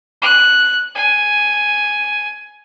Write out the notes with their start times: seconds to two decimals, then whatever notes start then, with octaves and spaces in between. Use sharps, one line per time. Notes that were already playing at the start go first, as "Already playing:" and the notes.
0.22 F#6
0.95 G#5